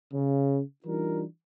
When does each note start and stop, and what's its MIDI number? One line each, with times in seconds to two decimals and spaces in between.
0.13 0.61 49
0.85 1.24 52
0.85 1.24 55
0.85 1.24 62
0.85 1.24 63
0.85 1.24 65
0.85 1.24 70